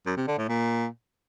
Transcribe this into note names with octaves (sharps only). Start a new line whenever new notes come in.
F#2
C3
D3
A2
A#2